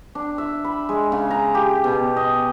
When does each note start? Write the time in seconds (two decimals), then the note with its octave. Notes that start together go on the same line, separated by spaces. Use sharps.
0.15 D4
0.38 E5
0.64 B5
0.89 G#3
1.12 C#3
1.30 A#5
1.55 G4
1.84 B2
2.16 D#5